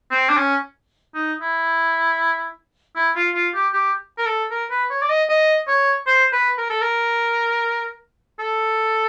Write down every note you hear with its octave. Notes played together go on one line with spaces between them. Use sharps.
C4
D4
C#4
D#4
E4
E4
F4
F4
G4
G4
A#4
A4
A#4
B4
C#5
D5
D#5
D#5
C#5
C5
B4
A#4
A4
A#4
A4